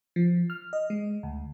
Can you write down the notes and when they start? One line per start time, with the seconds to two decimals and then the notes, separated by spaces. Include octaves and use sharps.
0.16 F3
0.50 F6
0.73 D#5
0.90 G#3
1.23 D2